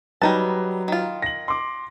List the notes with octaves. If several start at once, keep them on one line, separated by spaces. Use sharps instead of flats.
F#3 G3 D#4 B4 A5
D#3 F4
A#6 F#7
C6 D6